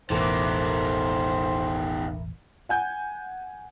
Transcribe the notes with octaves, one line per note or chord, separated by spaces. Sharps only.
E1 A1 D#3 E3 A#3 B3 A4 C5
F#5 G#5 G6